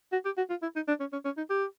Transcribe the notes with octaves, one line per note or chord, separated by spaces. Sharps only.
F#4
G4
F#4
F4
E4
D#4
D4
C#4
C#4
C#4
D#4
G4